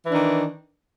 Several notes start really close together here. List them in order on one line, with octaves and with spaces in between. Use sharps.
E3 D4 D#3